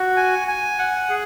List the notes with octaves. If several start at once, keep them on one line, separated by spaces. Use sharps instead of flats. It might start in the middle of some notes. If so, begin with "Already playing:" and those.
Already playing: F#4
G#5
G#5
F#5
G#4